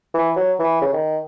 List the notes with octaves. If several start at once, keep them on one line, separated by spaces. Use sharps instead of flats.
E3
F#3
E3
C#3
D#3